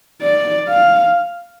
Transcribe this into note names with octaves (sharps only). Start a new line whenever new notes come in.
D5
F5